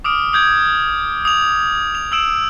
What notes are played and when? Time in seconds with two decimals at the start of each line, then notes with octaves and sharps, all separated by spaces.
0.04 D6 D#6 F6 D7
0.33 D#6 G6 G#6 D7
1.25 D#6 F7
1.95 F7
2.12 D#6 E6 D7 E7